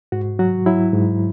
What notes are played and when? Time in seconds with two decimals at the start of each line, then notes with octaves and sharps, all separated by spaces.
0.12 G#2 F#4
0.39 F#3 F#4
0.66 F#3 E4
0.93 G#2